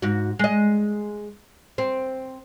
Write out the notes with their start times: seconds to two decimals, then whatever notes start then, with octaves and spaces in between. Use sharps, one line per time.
0.02 G#2 F#4
0.39 G#3 D#5
1.78 C4